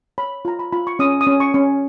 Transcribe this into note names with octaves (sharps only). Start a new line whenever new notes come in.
C#5 B5
F4 A#5
B5
F4 B5
C#6
C#4 D#6
D#6
C#4
C#6
C#4